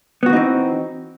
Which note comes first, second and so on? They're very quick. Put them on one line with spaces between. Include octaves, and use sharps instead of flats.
B3 F#4 E3 D#4 C4